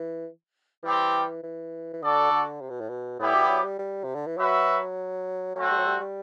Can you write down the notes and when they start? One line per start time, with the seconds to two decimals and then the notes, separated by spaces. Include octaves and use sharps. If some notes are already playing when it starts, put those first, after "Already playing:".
Already playing: E3
0.83 E3 G3 C4 G4
1.43 E3
1.93 E3
2.02 D3 F#4 A4 D5
2.31 D3
2.61 C3
2.70 B2
2.80 A2
2.89 B2
3.20 A2 B3 E4 G4 D5
3.35 B2
3.44 E3
3.49 F#3
3.63 G3
3.79 G3
4.04 C3
4.15 D3
4.27 E3
4.37 F#3 F#4 B4 E5
5.56 F#3 A3 C4 F#4
5.71 G3
5.78 F#3
5.86 G3
6.00 G3